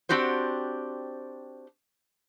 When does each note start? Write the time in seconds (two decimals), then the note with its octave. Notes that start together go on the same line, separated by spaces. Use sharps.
0.09 C4 D4 F#4 G4 C5